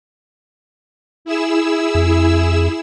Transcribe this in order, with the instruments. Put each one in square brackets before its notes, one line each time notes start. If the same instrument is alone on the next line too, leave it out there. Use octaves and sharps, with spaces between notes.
[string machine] E4 G#4 E6
[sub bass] F2